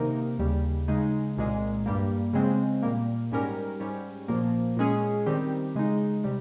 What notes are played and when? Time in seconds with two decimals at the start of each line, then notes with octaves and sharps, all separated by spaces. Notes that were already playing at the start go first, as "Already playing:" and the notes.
Already playing: C3 D#3 A#3 D#4 A#4
0.39 D#2 C#3 G3
0.88 C#3 G#3 D#4
1.37 C2 A#2 G#3
1.86 G2 G3 A#3
2.33 C#3 G#3 C4
2.83 A#2 G3 A#3
3.32 G#2 G3 C#4 G4 A#4
3.80 G#2 G3 C#4
4.28 A#2 F3 A#3
4.77 A#2 G#3 C#4 G#4
5.26 D#3 G3 C4 G4
5.75 C#3 G#3 D#4
6.24 C3 G3